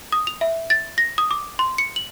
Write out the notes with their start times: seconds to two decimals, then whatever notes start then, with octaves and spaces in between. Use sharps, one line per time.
0.12 D#6
0.27 F7
0.41 E5
0.70 A6
0.98 A#6
1.18 D#6
1.31 D6
1.59 C6
1.78 C#7
1.96 F#7